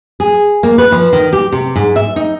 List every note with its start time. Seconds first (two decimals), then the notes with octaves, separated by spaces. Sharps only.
0.20 G#4
0.63 A#3
0.78 B4
0.92 F3
1.13 D#3
1.33 G4
1.52 C3
1.76 G#2
1.96 E5
2.16 D#4